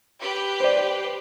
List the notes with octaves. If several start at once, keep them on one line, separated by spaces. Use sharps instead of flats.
G4 B4
C5 D5